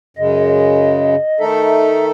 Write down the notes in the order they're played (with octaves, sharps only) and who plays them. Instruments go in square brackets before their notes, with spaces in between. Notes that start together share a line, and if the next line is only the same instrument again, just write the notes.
[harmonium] F#2 C#3 G#3 [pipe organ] D#5
[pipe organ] D#5
[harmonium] D#3 A3 D#4 A4 [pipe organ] E5